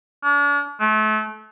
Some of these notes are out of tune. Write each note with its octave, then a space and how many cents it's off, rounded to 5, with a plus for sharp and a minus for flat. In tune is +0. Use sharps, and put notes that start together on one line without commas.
D4 -40
A3 -35